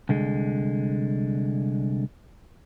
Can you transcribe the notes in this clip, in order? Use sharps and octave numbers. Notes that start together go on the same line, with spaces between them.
C2 D3 G#3